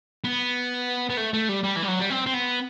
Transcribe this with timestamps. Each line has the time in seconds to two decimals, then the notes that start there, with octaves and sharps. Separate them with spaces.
0.24 B3
1.10 B3
1.17 A3
1.33 A3
1.49 G3
1.63 G3
1.76 E3
1.82 G3
1.88 F#3
1.99 G3
2.10 C4
2.26 C4
2.34 B3